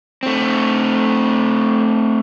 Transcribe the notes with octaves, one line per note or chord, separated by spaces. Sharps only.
A3 C4